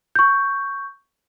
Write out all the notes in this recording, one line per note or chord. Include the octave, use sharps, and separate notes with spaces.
C#6 G6